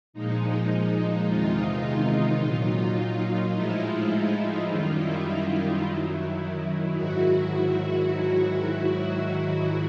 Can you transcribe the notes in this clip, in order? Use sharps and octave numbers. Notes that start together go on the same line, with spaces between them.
A#2 F3 G#3 D#4
E2 C3 D#3 G#3 D#4 F4
A#2 F#3
A2 F3 G#3 E4
D#4
E4
F#2 D#3 G3 D#4 F4
E4
E4
E4
F#2 D#3 F#3
G#2 D#3 F#3 E4 F#4